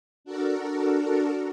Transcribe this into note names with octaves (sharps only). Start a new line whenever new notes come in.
D4 F#4 A4 A#4